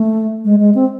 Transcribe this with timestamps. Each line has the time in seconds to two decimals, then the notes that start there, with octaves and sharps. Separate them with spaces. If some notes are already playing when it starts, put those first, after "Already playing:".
Already playing: A3
0.45 G#3
0.60 G#3
0.75 C4